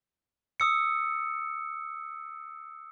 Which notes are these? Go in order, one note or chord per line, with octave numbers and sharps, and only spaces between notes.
D#6 E6 C#7